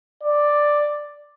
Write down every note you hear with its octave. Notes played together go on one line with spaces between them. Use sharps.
D5